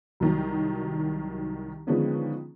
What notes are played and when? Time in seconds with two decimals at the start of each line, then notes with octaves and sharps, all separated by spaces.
0.20 C2 D#3 F#3
1.87 D3 D#3 F3 G#3 B3 C#4